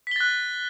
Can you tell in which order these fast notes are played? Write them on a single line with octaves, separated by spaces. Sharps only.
B6 G7 A6 F#6